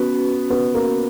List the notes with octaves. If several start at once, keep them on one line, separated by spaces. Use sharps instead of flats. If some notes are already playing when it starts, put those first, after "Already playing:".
Already playing: B3 C#4 F#4 B4
B3
A#3